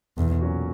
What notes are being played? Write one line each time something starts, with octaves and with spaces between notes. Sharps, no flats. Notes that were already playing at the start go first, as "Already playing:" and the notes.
B1 E2
A#2 F#3 C#4 F#4